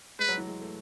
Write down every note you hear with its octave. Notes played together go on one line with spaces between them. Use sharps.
G#3 B4
F#3
E3
G#3
A3